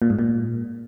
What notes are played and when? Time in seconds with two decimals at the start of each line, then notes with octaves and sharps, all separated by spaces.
0.02 A#2
0.10 G#2
0.19 A#2